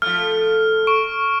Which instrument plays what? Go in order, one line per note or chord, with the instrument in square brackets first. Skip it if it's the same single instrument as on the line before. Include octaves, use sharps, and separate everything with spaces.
[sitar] F3 A3 [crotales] F6
[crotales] C#6 D7